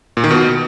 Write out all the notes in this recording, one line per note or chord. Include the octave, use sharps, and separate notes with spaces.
A#2
D#3
B2